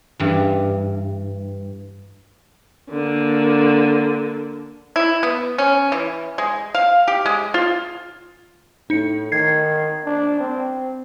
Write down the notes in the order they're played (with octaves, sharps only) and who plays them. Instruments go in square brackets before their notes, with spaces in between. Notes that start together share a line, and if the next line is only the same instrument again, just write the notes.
[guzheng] G2 E3
[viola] D3 A#3
[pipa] E4
B3
C#4
E3
G#3
F5
G4
G#3
F4
[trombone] A2 [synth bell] D#4 C#7
[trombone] D#3 [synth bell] G#6 C7
[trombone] D4
C4